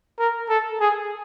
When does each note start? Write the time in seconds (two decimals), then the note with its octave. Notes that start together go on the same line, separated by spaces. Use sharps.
0.19 A#4
0.49 A4
0.81 G#4